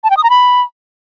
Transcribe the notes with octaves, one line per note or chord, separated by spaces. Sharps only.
A5
G5
D#6
A#5
B5